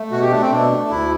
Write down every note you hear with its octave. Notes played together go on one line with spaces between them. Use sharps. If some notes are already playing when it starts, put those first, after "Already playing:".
Already playing: A3
B2 F#4
G4
A3 D4
C4
B2 D4
A3
D2 E4